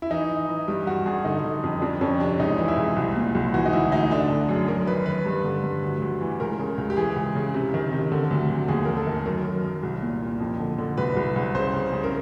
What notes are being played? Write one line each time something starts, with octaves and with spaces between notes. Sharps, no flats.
E4
E3 D#4
E3
E3
G2 G4
G2 F#4
G2 G#4
D3 D#4
D3
F2
F2 D4
F2 C#4
C3 D4
C#2 D#4
E3
E4
C#2
C2
A#2
C2
E3 F#4
D#4
D2 E4
D2 D#4
D3 D4
D3 D4
F#2 G#4
F#2 A#4
D#3 B4
D#3 B4
G2
D3
G2
D2
D2
E3
C#2 A#4
C#3
C#2
G4
E3 G#4
C#2
C#3
C3
D#3
C3
D3
D2
D2
D#2 G#4
D#2 A#4
A4
D#3
F#2 A#4
F#2
F#2
C2
A#2
A#2
F2
D3
D3
C2 B4
C2
C2
C#3 C5
C#3
C#3
A#4